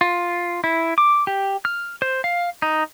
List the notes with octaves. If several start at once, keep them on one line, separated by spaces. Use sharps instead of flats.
F4
E4
D6
G4
F6
C5
F5
D#4